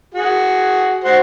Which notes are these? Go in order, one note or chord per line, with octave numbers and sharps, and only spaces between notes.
F#4 G#4
F#4 C5